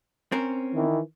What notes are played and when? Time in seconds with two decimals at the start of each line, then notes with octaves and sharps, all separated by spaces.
0.32 C4 C#4 A#4
0.75 D#3 E3